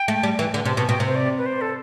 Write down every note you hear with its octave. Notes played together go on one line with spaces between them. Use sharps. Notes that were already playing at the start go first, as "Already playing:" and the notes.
Already playing: G5
A3
G3
E3
D3 A5
C3 A5
B2 A5
B2 G5
C3
C5
D5
B4
C5
A4